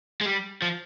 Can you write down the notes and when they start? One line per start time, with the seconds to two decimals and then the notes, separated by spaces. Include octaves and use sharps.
0.21 G#3
0.26 G3
0.62 F3